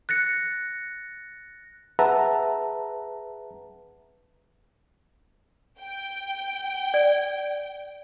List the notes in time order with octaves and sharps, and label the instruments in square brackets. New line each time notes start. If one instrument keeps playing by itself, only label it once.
[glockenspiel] F#6 A6 A#6 C#7
[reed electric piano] G#4 B4 E5 F#5 A5 A#5
[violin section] G5
[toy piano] D5